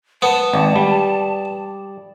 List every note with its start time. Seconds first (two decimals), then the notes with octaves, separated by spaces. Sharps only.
0.22 B3 A5
0.53 G#1 D5
0.76 G3